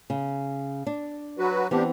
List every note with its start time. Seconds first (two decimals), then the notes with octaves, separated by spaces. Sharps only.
0.10 C#3
0.87 D4
1.39 F#3 F#4 B4
1.71 E3 B3 C4 D4 G4